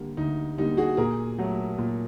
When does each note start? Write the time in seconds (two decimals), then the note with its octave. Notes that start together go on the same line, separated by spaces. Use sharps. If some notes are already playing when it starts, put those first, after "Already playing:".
Already playing: D3 G3 A#3
0.17 D2 D#4
0.58 D3 G3 A#3 D#4
0.77 F#4 G#4
0.97 A#2 G#4 A#4
1.38 F#3 A3
1.78 A#2